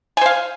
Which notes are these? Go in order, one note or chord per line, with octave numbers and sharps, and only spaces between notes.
C5 F5 G#5